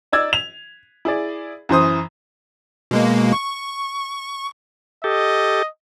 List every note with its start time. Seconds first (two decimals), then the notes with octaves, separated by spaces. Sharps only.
0.12 D#4 D5 E6 G#6
0.33 F7
1.05 E4 G#4 D5
1.69 F#2 E3 C5 D#6
2.91 B2 G#3 A#3
3.33 C#6
5.04 G4 A4 D#5